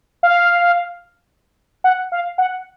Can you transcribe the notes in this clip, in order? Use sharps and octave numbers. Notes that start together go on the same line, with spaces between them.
F5
F#5
F5
F#5